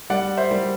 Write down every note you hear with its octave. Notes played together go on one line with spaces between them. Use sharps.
G3 D5 F#5
C5 E5
G3